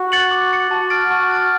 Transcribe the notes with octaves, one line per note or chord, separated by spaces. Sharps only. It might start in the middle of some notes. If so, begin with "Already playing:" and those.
Already playing: F#4
F#6 A6 C#7 F#7
D6
F#6 A6 C#7 F#7
F#4 A5
F6 A6 D7
F#4 A5
F6 A6 D7